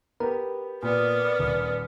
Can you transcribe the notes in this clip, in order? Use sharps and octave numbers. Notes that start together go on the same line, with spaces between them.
B3 G4 A#4
A#2 B3 D5 D#6 F6
D#1